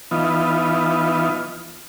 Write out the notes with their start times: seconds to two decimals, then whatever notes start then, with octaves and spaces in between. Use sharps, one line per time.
0.11 E3 B3 D#4 F4